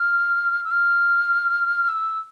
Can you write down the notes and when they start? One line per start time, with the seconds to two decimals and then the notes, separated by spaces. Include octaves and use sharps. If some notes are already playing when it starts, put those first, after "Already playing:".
Already playing: F6
0.64 E6
0.71 F6
1.88 E6